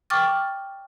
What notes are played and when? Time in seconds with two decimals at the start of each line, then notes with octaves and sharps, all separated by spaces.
0.10 G5 C#6 D6 F6 A6